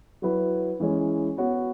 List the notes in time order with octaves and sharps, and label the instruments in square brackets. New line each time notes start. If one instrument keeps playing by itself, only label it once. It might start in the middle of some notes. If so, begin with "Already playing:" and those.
[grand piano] F#3 E4 B4
E3 G#3 C#4 E4 C#5
B3 F#4 C#5